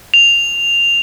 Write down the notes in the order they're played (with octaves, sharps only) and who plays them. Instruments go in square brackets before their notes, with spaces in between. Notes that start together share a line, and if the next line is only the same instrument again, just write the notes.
[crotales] F7